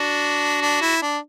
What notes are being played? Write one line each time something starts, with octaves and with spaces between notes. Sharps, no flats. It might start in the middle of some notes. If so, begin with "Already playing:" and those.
Already playing: D4 F#4
D4
E4
D4